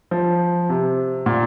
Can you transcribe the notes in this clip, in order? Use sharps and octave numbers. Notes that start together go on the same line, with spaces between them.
F3
C3
A#2